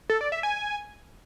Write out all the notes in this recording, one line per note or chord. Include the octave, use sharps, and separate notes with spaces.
A4
D5
E5
G#5